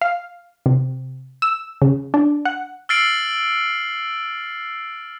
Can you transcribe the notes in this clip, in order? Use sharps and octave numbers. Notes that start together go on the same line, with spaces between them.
F5
C3
E6
C#3
D4
F#5
E6 F6 A6 C7 D7 F#7